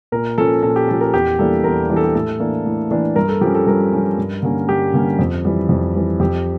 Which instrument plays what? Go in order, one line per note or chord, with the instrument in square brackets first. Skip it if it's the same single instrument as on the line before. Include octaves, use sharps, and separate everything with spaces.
[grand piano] A#2 A#4
F3 C#4 A4
A#2 A4
G4
F3 C#4 A4
A#4
E2 G4
E3 G3 A#3 D4 A4
E2 A#4
E3 G3 A#3 D4 G4
A4
G4
A2 A4
E3 A#3 D4
A2
E3 A#3 D4
G2 A#4
A4
F3 G4
C#4
A4
G2 A#4
F3 C#4
G2
D3 G3 A#3 C#4
G2 G4
D3 G3 A#3 C#4
F2
E3 G3
F2
E3 G3
F2 G4